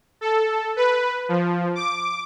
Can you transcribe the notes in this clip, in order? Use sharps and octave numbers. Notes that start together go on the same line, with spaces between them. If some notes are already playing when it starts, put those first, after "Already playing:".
A4
B4
F3
D6